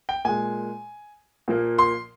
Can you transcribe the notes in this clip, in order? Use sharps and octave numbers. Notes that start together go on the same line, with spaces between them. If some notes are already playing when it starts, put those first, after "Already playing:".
G5
A#2 G#3 G#5
A#2 F3 A#3
C6